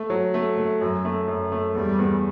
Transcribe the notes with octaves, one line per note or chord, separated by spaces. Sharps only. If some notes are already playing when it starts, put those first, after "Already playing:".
Already playing: A3
F#3
A3
A3
F#2 F#3
A3
F#2
A3
E2 G3
E2